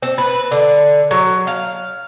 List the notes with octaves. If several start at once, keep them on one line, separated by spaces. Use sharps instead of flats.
C4
B4
D3
F#3
F5